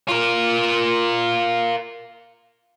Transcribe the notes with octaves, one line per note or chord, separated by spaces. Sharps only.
F4 A#4